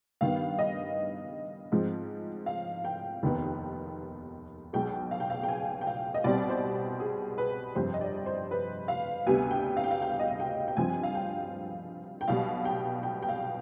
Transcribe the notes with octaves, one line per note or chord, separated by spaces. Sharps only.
G2 D#3 B3 F5
D#5
G#2 F3 G#3 C4
F5
G5
F1 D#2 D#3 B3
B1 B2 G#3 G5
F5
G5
F5
G5
G#5
G5
F5
D#5
C2 B2 G3 C4 D5
C5
G#4
B4
G1 F2 C3 C5
D#5
D5
C5
B4
F5
D2 C3 G3 B3 G#5
G5
F5
G5
F5
G5
D#5
F5
G5
G5
G2 F3 C4 G#5
F5
G5
G5
B1 B2 G3 F5
G5
G5
G5
F5